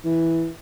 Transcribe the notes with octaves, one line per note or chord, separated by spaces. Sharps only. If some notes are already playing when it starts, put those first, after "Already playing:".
E3